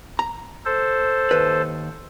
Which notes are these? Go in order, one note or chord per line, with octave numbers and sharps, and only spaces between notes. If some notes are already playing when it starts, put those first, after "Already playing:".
A#5
A4 C5
D#2 B4